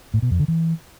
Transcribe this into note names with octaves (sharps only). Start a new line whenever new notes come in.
A2
B2
F2
D3
E3